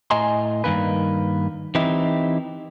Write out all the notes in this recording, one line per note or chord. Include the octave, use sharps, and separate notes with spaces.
A2 D#5 G#5 A#5 C6
G2 B2 D#3 A#3 B4
E3 C4 D#4 E4 G4